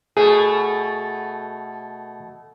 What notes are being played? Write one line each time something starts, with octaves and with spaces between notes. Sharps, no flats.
B2 A3 G#4